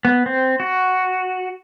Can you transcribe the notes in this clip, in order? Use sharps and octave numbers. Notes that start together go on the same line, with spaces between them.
B3
C4
F#4